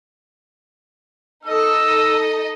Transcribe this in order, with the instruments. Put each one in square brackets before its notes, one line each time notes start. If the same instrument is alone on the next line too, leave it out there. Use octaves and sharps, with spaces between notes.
[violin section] D#4 A4 D#5 [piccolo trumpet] E6